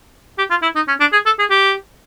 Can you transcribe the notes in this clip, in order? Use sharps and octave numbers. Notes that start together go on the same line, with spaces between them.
G4
F4
E4
D#4
C#4
D4
G#4
A4
G#4
G4